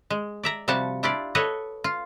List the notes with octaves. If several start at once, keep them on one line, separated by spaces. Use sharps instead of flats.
G#3
D5 E5 A#5
C3 F3 G3 F#4 A5
D4 E4 F4 G4 D5
F#4 A4 B4 C#5 D#5 F#5
F4